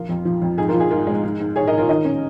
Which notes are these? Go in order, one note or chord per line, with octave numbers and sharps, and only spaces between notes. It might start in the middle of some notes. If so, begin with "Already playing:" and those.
Already playing: F3 F4 A#4
F2
F3
F2
G#2 G#4
F4 A#4
F3
G#4
G#2 F4 A#4
G#3
G#2
G#2
G#2 G#4 C#5
A#4 D#5
G#2
F4 A#4
D#3 A#4 D#5
C#4